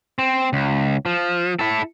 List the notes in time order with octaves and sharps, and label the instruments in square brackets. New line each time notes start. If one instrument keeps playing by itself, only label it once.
[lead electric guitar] C4
C#2
F3
E4 A4